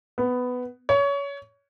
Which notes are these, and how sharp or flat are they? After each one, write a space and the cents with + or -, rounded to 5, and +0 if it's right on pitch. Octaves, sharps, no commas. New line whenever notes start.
B3 +10
C#5 +25